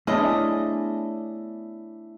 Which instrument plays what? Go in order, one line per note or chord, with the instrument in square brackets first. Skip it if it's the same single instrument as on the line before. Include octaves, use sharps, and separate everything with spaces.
[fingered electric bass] A3 [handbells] B3 C#5 G#5 [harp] D4 E4 [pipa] G#4 D#5